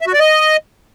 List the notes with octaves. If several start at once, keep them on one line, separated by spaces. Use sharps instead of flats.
E5
F#4
D5
D#5